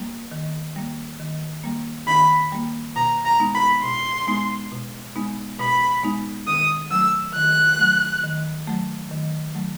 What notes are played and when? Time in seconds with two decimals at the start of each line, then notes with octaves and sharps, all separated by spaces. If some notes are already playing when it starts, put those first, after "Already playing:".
Already playing: G3 A#3
0.31 D#3
0.76 G3 A#3
1.20 D#3
1.64 G3 A#3
2.07 D#3 B5
2.52 G3 A#3
2.96 B2 A#5
3.25 A#5
3.39 G#3 B3 D#4
3.55 B5
3.83 B2 C6
4.27 G#3 B3 D#4
4.72 B2
5.16 G#3 B3 D#4
5.60 B2 B5
6.03 G#3 B3 D#4
6.48 D#3 D#6
6.91 F#3 A3 E6
7.35 D#3 F#6
7.79 F#3 A3
8.23 D#3
8.68 F#3 A3
9.11 D#3
9.55 F#3 A3